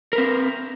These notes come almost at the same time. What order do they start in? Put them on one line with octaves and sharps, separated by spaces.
A#4 B4 C4